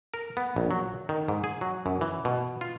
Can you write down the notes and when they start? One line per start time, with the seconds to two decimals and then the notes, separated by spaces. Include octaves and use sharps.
0.14 A#4
0.37 B3
0.56 A#1
0.71 F#3
1.09 D#3
1.28 G#2
1.44 G#4
1.61 F#3
1.86 F#2
2.01 E3
2.25 B2
2.61 F4